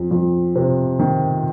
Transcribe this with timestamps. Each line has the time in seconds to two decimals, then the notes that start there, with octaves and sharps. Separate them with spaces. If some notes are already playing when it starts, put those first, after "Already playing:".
Already playing: F2
0.11 F2
0.56 C3
0.99 D#3